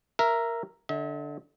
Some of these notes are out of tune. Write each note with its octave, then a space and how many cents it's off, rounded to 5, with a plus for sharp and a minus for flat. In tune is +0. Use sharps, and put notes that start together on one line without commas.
A#4 +0 E5 +15
D3 +0 E5 -45